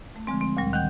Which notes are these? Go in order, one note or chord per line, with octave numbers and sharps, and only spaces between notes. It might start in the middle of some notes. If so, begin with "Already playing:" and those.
A3
D3 F3 G#3 C4
C4
D2 A#2 G3
D#3 F#5 G5 G6